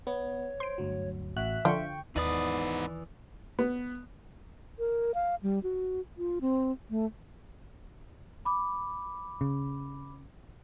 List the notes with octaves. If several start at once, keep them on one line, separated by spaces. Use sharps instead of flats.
B3 C#5
C5 C6 D7
G1 D2 F#3
A1 F#4 E5 F#6
D3 F3 F4 G5 C#6
D#2 G#2 E3 B3 D#4 B4 D5 D#6
B3
A#4
F5
G3
F#4
F4
C4
A3
B5 D6
C#3